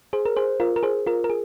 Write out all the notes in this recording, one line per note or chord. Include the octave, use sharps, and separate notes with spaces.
G#4 C5
A#4
G#4 C5
F4 A#4
A#4
G#4 C5
F4 A#4
A#4
G#4